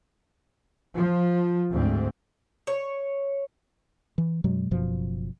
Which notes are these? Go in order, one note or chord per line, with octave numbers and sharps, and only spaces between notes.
F3
D2 G#2 C4
C#5
E3
F#2 B2 F#3 G#3
F#1 F#2 B2 F3